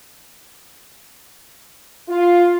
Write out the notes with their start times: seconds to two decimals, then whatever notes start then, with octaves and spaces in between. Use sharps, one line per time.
2.09 F4